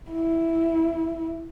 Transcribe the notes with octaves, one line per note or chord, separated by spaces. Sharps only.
E4